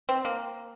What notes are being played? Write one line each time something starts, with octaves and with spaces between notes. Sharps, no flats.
C4
A#3